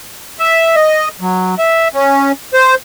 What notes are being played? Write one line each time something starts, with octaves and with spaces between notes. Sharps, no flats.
E5
D#5
F#3
E5
C#4
C5